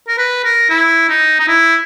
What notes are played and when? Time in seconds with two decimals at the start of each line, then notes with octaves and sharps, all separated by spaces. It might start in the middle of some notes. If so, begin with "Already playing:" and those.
0.08 A#4
0.18 B4
0.44 A#4
0.70 E4
1.09 D#4
1.40 D#4
1.48 E4